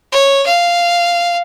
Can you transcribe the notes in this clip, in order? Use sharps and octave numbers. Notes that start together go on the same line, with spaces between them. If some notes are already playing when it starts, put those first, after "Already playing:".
C#5
F5